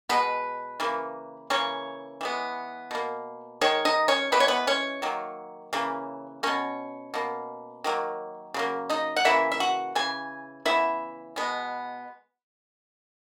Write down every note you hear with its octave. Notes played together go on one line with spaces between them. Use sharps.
B2 G#3 B3 B4
C#3 E3 A#3
C#3 E3 A#3 C#4 C#5
E3 G#3 B3
B2 A#3
D#3 G#3 C#5
D#4 D#5
C#4 C#5
E3 G#3 B3 B4
C#5
B3 B4
C#4 C#5
D#3 F#3 A#3
C#3 E3 A#3
B2 A#3 C#4 C#5
B2 A#3
D#3 F#3 A#3
C#3 F#3 A#3
D#4 D#5
F#5
C#3 E3 A#3 E4 E5
E5
F#4 F#5
C#3 E3 G#5
C#3 E3 B3 E4 E5
B2 G#3 B3